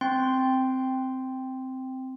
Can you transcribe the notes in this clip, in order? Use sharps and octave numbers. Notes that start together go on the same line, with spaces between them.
C4 G5 C6